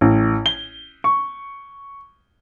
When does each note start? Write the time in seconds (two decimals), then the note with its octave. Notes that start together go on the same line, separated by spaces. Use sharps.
0.01 A1
0.46 G7
1.04 C#6